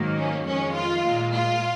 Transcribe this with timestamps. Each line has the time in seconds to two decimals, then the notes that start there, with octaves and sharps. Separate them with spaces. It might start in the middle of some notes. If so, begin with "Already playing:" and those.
Already playing: G#2 D#3 F#3 A#3
0.18 C#4
0.46 F2 D#3 G#3 C#4
0.75 F4
1.04 A#2 G#3
1.33 F4